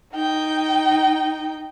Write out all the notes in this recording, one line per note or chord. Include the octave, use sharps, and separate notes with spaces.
D#4 G5